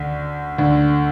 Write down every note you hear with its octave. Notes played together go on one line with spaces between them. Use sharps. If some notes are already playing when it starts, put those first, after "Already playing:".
Already playing: D2 D3
D2 D3